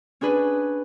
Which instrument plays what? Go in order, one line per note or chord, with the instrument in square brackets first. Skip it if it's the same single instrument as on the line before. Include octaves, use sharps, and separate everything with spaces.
[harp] C#4 D4 G#4 B4